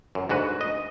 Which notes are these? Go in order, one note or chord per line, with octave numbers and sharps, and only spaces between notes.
F#2
D2 G#2 F#4 B4
D#5